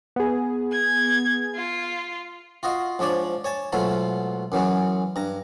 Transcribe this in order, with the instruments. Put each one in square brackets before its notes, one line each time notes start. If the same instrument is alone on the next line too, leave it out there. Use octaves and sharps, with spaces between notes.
[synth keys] B3 G#4
[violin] G#6
F4
[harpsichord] F4 F#4 D#5 F5
G#2 F3 D4 C#5 D5
C#5 G#5 A5
G#2 B2 F#3 A3 F4
F#2 E3 F#3 G#3
G2 A#5